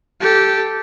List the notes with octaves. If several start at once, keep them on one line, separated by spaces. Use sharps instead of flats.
G4 A4